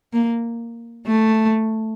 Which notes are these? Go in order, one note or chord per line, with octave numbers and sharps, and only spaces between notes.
A#3
A3